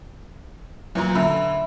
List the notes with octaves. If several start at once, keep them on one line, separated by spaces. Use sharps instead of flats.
E2 A#2 F#3 A#5
D3 E5 B5